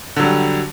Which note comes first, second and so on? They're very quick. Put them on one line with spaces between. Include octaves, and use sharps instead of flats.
D3 F#3 G3